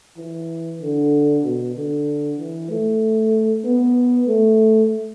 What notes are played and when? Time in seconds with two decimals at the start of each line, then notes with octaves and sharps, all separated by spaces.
0.17 E3
0.81 D3
1.43 B2
1.75 D3
2.38 E3
2.70 A3
3.65 B3
4.28 A3